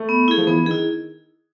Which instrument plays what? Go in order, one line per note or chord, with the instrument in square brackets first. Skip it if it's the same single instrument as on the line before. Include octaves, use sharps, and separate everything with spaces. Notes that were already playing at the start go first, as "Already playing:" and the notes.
Already playing: [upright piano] A3
[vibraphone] B3
E4 G#4
[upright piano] F3
[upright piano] E3 [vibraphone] B3
[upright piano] D#3 [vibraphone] E4 G#4